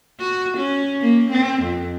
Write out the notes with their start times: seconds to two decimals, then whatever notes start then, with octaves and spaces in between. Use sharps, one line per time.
0.20 F#4
0.57 C#4
1.01 A#3
1.31 C4
1.62 F2